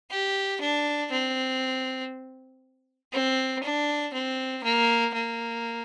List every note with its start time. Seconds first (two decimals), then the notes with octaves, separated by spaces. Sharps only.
0.10 G4
0.60 D4
1.11 C4
3.12 C4
3.63 D4
4.13 C4
4.64 A#3
5.14 A#3